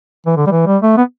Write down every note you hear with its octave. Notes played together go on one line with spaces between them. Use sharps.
E3
D3
G3
E3
G3
A3
B3